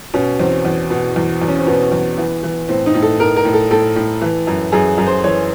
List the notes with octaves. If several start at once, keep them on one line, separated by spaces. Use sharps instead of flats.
B2 C#4
E2 C4
E2
B2
E2
E2
C#4
C4
B2 B3
E2
E3
E3
A2 C4
D#4
A2
A4
A2 A#4
A#4
A2
A4
A2 A4
A2
E3
F#2
F#2 G#4
F#2
C5
E3 C#5